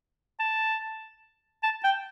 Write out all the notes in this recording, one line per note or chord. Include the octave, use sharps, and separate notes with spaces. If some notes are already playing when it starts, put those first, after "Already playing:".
A5
A5
G5